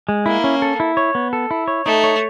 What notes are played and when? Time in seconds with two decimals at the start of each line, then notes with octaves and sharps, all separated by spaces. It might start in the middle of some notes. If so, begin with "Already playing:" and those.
0.09 G#3
0.26 A#3 E4
0.44 C#4
0.62 A4
0.80 E4
0.97 C#5
1.15 B3
1.33 A4
1.51 E4
1.68 C#5
1.85 A3 D#4
2.04 C#5